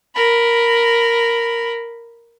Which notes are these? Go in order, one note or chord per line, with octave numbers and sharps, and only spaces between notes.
A#4 B5